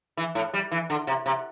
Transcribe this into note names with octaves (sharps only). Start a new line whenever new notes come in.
E3
A2
G3
E3
D3
C3
C3